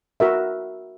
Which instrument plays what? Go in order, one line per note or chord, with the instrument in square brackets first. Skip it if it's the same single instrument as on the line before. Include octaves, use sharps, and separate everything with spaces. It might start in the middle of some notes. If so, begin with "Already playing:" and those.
[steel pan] F#4 A#4 E5